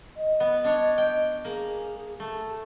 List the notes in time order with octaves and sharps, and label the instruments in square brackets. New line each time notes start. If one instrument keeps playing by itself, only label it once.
[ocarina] D#5
[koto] B3
D4 C#5
G5
[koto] A#3 [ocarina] G#4
[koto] A3